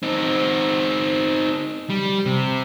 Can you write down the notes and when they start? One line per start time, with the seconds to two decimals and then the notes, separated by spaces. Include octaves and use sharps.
0.03 C4 D#4
1.90 G3
2.26 C3